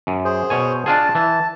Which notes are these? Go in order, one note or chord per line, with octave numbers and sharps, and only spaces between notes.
F#2
G#4 C5
B2 C#5 G#5
D4 F4 G#4 A5
E3 A5